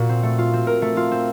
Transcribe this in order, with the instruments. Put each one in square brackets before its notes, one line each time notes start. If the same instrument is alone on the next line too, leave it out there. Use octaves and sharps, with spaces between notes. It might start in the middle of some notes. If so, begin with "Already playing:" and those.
Already playing: [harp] A#2 F#4
C4
A3
F4
C4
A#4
A3
F4
C4